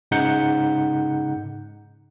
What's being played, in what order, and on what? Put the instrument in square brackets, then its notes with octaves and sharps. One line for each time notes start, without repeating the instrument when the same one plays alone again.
[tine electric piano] G#2 C#3 D#4 F#5 G6 C#7